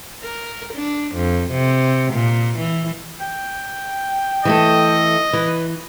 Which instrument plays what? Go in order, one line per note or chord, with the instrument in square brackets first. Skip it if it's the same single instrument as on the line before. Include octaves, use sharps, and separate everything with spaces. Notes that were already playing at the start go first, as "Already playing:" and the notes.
[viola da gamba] A#4
D4
F2
C3
A#2
E3
[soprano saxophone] G5
[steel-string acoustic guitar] E3 A3 A4 [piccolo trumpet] D#5
[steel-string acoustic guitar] E3 [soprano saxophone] B4